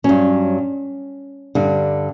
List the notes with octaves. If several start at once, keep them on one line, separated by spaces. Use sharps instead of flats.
G2 F#3 C#4
G2 D3 G3